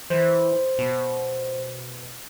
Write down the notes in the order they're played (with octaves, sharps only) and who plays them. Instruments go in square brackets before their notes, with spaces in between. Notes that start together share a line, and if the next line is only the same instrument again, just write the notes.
[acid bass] E3 [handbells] C5
[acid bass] B2